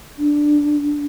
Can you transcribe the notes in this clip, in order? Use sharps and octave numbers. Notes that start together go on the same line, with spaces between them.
D4